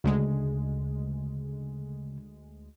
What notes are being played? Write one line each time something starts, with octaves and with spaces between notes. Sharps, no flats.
D2 C#3 G#3